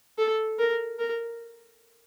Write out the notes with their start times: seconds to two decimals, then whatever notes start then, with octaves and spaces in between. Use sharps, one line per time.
0.18 A4
0.59 A#4
0.99 A#4